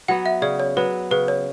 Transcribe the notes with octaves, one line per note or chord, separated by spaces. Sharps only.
F#3 B3 F#5
E5
C#3 D5
C#5
F#3 B3 B4
C#3 B4
C#5